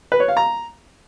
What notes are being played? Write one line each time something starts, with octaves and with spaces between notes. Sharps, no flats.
B4
C#5
F5
A#5